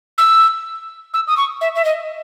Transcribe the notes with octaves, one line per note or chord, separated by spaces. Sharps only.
E6
E6
D#6
C#6
E5
E5
D#5